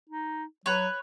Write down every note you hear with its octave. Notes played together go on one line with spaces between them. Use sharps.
D#4
F#3 B4 C#5